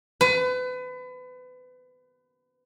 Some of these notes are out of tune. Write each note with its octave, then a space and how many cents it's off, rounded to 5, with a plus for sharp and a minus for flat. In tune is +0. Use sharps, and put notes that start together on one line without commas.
B4 +30